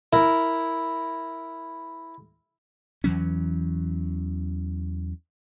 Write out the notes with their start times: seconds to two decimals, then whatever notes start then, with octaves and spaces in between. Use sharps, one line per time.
0.13 E4 A#4
3.04 E2 E3 F#3 C#4